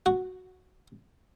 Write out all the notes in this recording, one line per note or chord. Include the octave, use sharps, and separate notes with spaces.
F#4